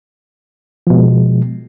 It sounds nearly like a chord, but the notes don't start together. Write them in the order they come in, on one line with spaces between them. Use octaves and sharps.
F3 B2 G#3